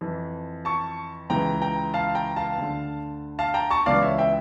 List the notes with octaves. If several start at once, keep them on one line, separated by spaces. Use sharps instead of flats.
F2 E3
A5 C#6
C#2 C#3 E3 G5 A#5
G5 A#5
F5 A5
G5 A#5
F5 A5
D2 D3
F5 A5
G5 A#5
A5 C#6
C#2 C#3 E3 D5 F5
C#5 E5
E5 G5